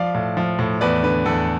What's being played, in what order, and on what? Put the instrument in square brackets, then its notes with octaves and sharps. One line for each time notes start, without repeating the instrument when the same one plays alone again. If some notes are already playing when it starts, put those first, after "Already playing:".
Already playing: [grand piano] F3 D5 F5
A2
F3
A2
E2 B4 D5
D3 B4
E2 A4